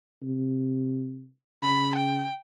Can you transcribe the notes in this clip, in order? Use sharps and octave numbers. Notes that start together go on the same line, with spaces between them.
C3
C#3 B5
G5